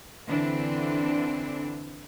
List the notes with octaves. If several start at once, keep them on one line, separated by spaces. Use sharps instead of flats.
D3 E3 C4 D4